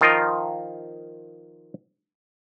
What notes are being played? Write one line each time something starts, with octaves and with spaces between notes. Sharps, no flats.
D#3 F3 F4 A#4 D#5